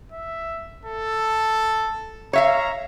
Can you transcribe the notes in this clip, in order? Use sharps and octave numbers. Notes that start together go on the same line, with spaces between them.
E5
A4
C#5 E5 F5 A#5